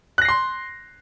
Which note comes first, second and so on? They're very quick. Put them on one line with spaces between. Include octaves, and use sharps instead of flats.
F#6 A#6 C7 C6